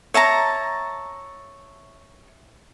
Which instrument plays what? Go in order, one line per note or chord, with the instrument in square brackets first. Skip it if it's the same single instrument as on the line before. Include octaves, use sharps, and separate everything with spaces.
[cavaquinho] C#5 E5 A5 A#5